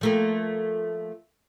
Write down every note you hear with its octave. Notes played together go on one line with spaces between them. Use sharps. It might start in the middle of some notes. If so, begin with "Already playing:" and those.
F3 A3 A#3